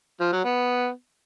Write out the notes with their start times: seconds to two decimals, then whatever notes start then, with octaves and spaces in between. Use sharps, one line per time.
0.20 F3
0.32 F#3
0.44 B3